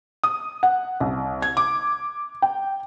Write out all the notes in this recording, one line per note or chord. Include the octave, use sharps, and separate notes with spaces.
D#6
F#5
C2
G#6
D6
G5